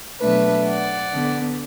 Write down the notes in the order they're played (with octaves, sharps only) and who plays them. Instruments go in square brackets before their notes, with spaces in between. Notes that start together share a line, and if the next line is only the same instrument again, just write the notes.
[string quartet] B2 F#3 A3 D4 B4 E5
D5 F#5
D3 B3 D4